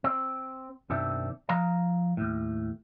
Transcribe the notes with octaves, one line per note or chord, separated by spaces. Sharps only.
C4
B1 F#2 D#3 C4 D4 E5
F3 F5 A#5
D#2 A2